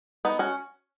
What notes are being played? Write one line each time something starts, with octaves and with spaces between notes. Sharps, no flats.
B3 D#4
C#4 F#4